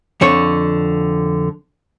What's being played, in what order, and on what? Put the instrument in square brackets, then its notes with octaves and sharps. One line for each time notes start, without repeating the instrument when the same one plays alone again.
[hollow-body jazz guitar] F2 D3 C#5